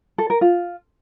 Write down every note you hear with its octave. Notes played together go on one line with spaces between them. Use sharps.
A4
A#4
F4